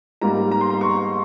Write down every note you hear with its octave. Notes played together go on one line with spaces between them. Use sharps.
G#2 G3 A#3 A#5
A#5
C6
A#5
C#6